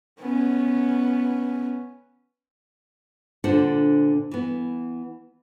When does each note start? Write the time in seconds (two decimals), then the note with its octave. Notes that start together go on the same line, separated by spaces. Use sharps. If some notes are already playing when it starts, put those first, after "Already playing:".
0.21 B3 C#4
3.44 A#2 D3 D4 C5 F#5
4.31 E3 B3